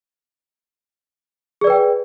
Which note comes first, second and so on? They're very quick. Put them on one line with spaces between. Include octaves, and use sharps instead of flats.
G#4 D5 B4 G5